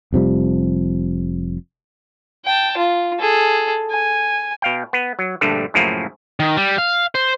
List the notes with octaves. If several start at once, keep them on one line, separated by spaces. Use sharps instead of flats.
F1 C3 F3 G3
G5 A5
F4
G#4 A4
G#5
B2 F5 G5
B3
F#3
A#1 G2 D3 G3 A3
F#2 A2 C#3 F3 A3 A#3
D#3
G3
F5
C5